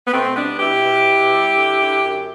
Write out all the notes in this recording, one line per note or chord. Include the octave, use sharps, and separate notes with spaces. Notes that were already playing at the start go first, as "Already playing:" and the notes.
B3
B2 A3 C4
G3 B3 D4
B2 E4 G4
B2
B2
G3
D3
D3
F#2